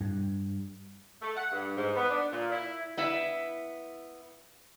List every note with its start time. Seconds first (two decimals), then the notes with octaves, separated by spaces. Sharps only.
0.01 G2
1.21 A3
1.36 F#5
1.51 G2
1.76 G#2
1.95 B3
2.10 D4
2.31 A#2
2.51 E4
2.97 B3 E4 E5